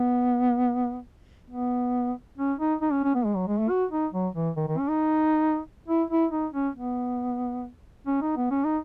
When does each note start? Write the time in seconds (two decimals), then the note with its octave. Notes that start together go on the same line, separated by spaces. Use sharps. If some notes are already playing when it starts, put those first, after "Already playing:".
Already playing: B3
1.50 B3
2.38 C#4
2.59 D#4
2.81 D#4
2.92 C#4
3.04 C#4
3.15 B3
3.25 G#3
3.36 F#3
3.47 G#3
3.58 A3
3.69 F#4
3.91 D#4
4.12 F#3
4.34 E3
4.56 D#3
4.67 D#3
4.78 C#4
4.89 D#4
5.88 E4
6.10 E4
6.31 D#4
6.54 C#4
6.75 B3
8.07 C#4
8.22 D#4
8.36 B3
8.51 C#4
8.64 D#4